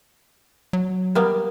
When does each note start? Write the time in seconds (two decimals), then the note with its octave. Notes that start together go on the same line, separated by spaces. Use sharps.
0.73 F#3
1.15 G3 A#3 B3